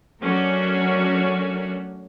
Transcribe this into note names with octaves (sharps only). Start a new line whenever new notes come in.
F#3 A3 C#4 D4 F#4 A#4